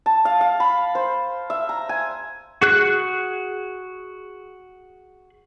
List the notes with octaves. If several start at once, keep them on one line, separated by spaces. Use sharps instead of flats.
A5
F5
F5
B5
C5
E5
A#5
G#5
F#4 G#4 F#6